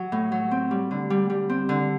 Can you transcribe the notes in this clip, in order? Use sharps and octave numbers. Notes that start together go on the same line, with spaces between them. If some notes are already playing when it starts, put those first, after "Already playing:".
Already playing: F#3
A2
F#3
C4
G3
D3
G3
G3
C4
D3